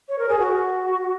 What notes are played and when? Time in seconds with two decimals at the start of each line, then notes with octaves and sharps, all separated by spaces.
0.08 C#5
0.18 A#4
0.28 G#4
0.38 F#4